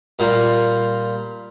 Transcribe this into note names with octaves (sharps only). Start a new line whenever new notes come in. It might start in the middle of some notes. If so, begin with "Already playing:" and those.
A#2 G3 A#3 F4